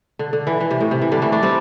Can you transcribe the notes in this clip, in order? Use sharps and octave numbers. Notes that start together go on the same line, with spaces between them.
D3
D3
E3
E3
C3
A2
C3
E3
D3 G3
E3 A3
A3 D4
G3 C4